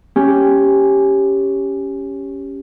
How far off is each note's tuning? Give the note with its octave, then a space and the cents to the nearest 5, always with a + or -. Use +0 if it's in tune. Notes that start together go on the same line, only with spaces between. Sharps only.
C#4 +0 G4 +0